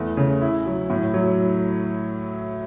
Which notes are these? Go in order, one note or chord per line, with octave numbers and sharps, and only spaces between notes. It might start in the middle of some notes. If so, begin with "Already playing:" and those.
Already playing: E2 A3
C#3
E4
F#3
A2
F#3